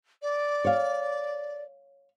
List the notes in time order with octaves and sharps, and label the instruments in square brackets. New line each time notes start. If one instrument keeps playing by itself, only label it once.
[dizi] D5
[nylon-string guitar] C#5 F5